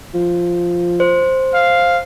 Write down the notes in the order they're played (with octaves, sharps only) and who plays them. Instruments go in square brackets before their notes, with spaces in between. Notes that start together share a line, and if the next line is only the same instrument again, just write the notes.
[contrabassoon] F3
[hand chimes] C5
[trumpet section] F5